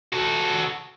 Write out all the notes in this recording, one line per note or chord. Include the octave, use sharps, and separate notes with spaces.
F#4 A4